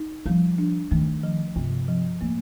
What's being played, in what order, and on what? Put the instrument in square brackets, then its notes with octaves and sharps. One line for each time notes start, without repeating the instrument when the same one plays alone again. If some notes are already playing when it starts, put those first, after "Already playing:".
Already playing: [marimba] D#4
[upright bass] F3 [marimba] G3
[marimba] D4
[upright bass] D#3 [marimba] A3
[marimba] F3
[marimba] G2 [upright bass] C3
[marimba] F3
[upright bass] A2 [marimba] A#3